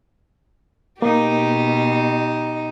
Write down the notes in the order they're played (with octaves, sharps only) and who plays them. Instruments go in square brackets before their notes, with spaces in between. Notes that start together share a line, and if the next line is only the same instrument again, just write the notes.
[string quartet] B2 G4 [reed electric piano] A#3 [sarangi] D#4